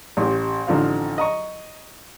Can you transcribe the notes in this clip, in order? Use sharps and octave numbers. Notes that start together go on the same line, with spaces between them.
A1 G4
A1 D3 F3 D#4 F5
D#5 A#5 C#6